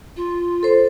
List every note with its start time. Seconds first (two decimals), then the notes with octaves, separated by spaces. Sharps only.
0.16 F4
0.63 A4 C5